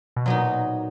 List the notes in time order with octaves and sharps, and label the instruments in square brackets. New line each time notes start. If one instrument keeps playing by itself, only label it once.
[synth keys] B2
[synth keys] A#2 [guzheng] F#3 B3 D#4